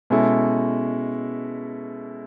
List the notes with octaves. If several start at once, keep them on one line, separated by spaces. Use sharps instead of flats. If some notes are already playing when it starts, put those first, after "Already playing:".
B2 G#3 C#4 E4 A4